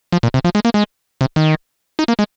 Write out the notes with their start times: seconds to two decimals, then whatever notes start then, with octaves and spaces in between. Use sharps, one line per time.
0.12 F3
0.23 A#2
0.34 C3
0.44 F3
0.55 G#3
0.65 A#3
0.74 G#3
1.21 C3
1.36 D#3
1.99 D#4
2.08 A#3
2.19 G#3